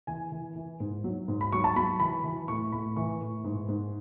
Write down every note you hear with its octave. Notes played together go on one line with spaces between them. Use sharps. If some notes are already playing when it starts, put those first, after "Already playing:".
E3 G#5
E3
E3
G#2
F#3
G#2
B5
F#3 C#6
A5
F#3 B5
E3 B5
E3
A2 C#6
A2 B5
E3 C#6
A2
G#2
G#2